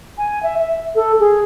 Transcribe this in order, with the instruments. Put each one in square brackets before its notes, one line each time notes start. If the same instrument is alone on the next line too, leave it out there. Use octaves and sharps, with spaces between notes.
[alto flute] G#5
E5
E5
A4
G#4